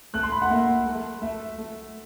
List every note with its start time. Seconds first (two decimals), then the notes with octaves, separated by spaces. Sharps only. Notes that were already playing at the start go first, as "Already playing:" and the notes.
0.14 A3 F#6
0.23 C6
0.32 B5
0.42 F#5
0.50 A#3 E5
0.85 A3
1.22 A3 E5
1.58 A3